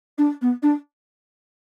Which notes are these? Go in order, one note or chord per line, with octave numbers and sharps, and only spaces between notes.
D4
B3
D4